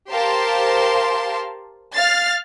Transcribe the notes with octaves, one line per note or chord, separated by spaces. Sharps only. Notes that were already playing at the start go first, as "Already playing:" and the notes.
G4 A#4 C5 F5 A5 C6
F5 F6 A6 C7